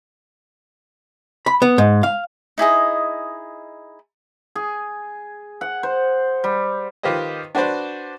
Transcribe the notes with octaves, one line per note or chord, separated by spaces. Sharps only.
B5
B3
G#2
F5
D#4 E4 G#4 D#5
G#4
F#5
C5
G3
D#3 F4 G4 B4 C5 D#5
D4 F#4 B4 C5 D5